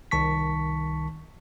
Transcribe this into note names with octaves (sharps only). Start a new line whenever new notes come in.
C2 D#3 A5 C#6 B6